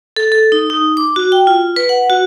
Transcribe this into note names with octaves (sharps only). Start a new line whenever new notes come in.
A4
A4
D#4
D#4
D6
F#4
G5
F4
B4
F#5
F#4